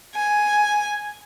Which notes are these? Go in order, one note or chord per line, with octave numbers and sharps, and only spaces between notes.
G#5